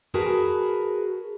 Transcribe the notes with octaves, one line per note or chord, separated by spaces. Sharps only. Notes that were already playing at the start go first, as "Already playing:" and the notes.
F#4 G#4 A#4 B4 G#5 A5